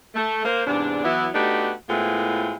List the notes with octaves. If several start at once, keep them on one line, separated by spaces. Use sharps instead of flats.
A3
A#3 C5
E2 G#2 C3 D4
E3 F#3 B3 E4
A3 B3 D4 D#4 F#4 G4
A2 G#3 B3 C4 E4 F4